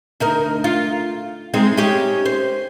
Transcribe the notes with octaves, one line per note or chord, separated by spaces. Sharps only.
D2 D#4 A#4
F4
G#3 C4 D#4
C#4 D#4 G4
C5